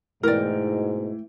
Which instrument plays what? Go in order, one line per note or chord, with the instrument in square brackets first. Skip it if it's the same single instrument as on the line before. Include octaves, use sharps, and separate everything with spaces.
[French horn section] G#2 B2 [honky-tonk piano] E3 [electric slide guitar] A3 G5 [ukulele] A#4 D5